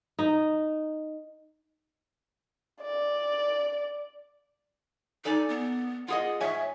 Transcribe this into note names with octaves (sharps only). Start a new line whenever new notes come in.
D#4
D5
D#4 A4 D5 G#5
B3
F4 G#4 D#5 F#5
G#2 C#5 E5 G#5